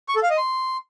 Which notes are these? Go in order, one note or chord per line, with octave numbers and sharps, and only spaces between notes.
C#6
A4
F5
D#5
C6